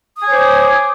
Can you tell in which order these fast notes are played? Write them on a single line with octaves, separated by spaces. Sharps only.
D#6 G#5 C#5 C5 D6